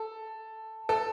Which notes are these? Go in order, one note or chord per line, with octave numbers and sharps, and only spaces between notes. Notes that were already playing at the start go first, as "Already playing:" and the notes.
Already playing: A4
A4